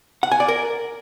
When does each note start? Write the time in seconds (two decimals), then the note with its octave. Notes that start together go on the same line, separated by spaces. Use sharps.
0.23 F#5
0.32 G#5
0.40 D5
0.48 A#4